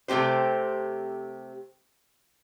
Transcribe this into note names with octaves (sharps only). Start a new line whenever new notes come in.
C3 A3 C4 G4 C5